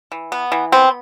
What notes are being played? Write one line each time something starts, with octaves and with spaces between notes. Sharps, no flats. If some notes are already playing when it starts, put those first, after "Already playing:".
E3
B3
E3
B3 C4